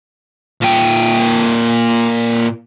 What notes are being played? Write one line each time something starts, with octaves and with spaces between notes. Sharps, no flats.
A#2 G5